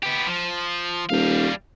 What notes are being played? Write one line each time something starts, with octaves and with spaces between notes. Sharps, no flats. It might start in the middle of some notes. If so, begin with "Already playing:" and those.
B3 G4
F3
D#1 G3 F5